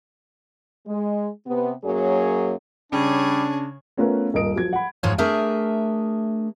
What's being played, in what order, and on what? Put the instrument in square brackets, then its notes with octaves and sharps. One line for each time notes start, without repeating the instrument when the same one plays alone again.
[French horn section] G#3
C3 B3
F#2 F#3 A#3 G#4 C#5
[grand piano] C#3 [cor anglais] G3 [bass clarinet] D4 [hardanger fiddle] G#4 C#5
[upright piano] A3 B3 C#4 F4 A#4 B4
D#1 G2 A#4 D#5 D#6 D7
F3 F#3 G#6
F#5 B5
[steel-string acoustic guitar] G#2 F3 G#3 G#4 C#5 F5
A3 D4 G#4 A#4 D#5 E5